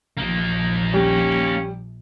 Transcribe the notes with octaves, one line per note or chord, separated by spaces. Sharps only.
A#1 A#3 D#4
G3 C#4